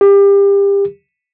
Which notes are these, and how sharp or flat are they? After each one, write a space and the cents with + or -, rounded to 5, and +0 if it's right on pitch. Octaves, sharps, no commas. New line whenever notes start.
G4 +30